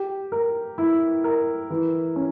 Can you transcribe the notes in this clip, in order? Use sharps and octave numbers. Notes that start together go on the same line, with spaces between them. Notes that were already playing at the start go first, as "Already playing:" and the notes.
Already playing: G4
A#4
E4
A#4
E3
C#4